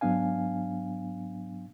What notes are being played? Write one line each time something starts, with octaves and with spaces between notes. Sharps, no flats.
G#2 F#3 B3 D4 F5 G#5